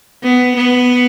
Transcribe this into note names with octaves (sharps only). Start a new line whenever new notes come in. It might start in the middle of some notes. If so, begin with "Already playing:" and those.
B3
B3